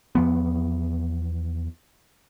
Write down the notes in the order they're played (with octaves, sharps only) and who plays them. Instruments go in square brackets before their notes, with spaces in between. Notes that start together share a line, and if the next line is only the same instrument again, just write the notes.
[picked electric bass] E2 F3 B3